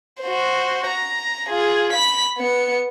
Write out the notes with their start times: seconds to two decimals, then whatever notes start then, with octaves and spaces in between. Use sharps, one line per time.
0.22 F#4 C5
0.87 A#5
1.49 F4 G#4
1.93 B5 B6
2.38 B3 C#7